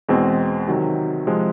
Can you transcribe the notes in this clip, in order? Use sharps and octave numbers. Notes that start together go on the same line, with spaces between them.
E2 B2 G#3 C4
C3 D#3 F#3
C3 F3 G#3